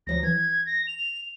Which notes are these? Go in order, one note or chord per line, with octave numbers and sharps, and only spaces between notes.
D2 F3 F#3 A#6
E3 G#6
A#6
F7